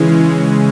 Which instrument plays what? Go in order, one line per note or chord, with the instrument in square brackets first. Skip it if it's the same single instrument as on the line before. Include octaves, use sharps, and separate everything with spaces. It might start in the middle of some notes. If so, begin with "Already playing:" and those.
Already playing: [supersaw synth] C#3 G#3 C#4 [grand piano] E3